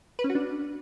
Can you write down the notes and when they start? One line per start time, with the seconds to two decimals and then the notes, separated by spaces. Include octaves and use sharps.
0.19 B4
0.24 C#4
0.30 F#4
0.35 D4